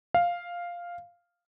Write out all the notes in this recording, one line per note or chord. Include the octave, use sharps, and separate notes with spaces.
F5